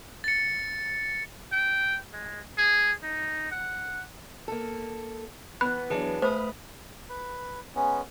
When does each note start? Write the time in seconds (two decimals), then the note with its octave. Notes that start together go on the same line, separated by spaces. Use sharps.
0.24 A6 C#7
1.53 G5
2.13 G#3
2.58 G#4
3.03 D#4
3.52 F#5
4.48 A#3 A4
5.61 E3 B3 B5 F#6
5.90 E3 F#3 D4 G#4 B4 A5
6.22 A3 B4 C5 F5 B5 D#6
7.09 B4
7.75 G#3 B3 C#4